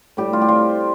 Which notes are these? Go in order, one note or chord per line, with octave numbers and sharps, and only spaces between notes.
A2 G3 G4
F4
G4
C3 G3 F4